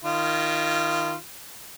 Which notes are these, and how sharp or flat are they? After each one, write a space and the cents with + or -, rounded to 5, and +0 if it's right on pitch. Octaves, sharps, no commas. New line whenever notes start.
D#3 +0 F4 -25